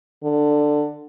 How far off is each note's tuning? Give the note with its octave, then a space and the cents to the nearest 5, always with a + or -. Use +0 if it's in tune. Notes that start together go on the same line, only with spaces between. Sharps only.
D3 +10